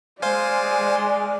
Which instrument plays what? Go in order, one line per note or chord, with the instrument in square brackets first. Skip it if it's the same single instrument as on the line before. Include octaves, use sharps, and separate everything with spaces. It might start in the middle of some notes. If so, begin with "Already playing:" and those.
[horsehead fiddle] G#3 [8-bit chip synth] C5 F5 G#5 [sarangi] D5